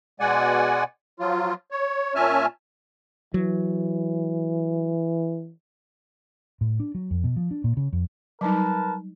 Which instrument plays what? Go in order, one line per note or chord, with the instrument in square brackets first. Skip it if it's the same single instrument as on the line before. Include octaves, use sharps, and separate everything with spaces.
[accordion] B2 G#3 D5 F#5 G#5
F3 F#3 F4
C#5
A#2 C#4 E5 G#5 A5 F6
[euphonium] E3 [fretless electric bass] F#3
[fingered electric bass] A2
D4
F#3
F2
B2
F3
D4
A#2
C#3
F2
[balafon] F#3 G3 D#4 [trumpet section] A#4 B4 A5